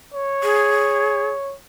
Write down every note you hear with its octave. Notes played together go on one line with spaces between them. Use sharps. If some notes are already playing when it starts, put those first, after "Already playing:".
C#5
G#4